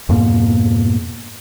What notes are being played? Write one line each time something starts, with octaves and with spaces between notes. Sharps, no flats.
F2 G#2 B2 A#3